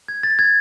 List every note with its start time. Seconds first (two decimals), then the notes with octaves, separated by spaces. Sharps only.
0.08 G#6
0.23 A6
0.39 G#6